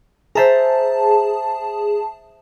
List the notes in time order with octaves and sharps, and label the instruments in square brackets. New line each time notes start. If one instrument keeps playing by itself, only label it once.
[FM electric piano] G#4 A5 [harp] C5 E5 A#5